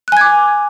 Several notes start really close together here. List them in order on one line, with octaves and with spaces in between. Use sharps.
F#6 G#5 G#6 D6